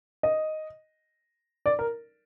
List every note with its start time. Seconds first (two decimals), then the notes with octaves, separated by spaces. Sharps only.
0.23 D#5
1.66 D5
1.79 A#4